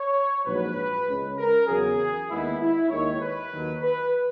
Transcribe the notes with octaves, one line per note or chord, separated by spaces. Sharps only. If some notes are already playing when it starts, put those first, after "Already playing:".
Already playing: C#5
A#1 G#2 F#3 B4
C#2 C#3 G#3 C#4
A#4
E2 C#3 F#3 G#4
D#2 D#3 G#3 B3 E4
E4
D#2 D#3 G#3 C#5
B4
D#2 D#3 F#3
B4